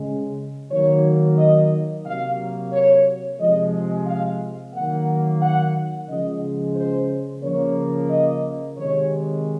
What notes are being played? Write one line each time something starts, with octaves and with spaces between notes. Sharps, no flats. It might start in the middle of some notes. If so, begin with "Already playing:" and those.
Already playing: C#3 G#3
D#3 F#3 A#3 C#5
D#5
C3 F#3 A#3 F5
C#5
C3 F3 G#3 D#5
F5
D#3 F#3 A#3 F#5
F#5
C#3 F3 G#3 D#5
C5
C#3 F3 A#3 C#5
D#5
C3 D#3 G#3 C#5